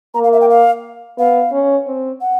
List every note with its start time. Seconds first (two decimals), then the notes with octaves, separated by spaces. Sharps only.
0.14 A#3 A#5
0.24 F5
0.33 E5
0.41 G5
0.50 F5
1.18 B3 F5
1.52 C#4
1.87 C4
2.21 F#5